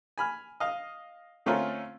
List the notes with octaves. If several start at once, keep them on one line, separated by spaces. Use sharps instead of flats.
G#5 B5 F6
D#5 F5
D3 A3 C4 C#4 F4 A#4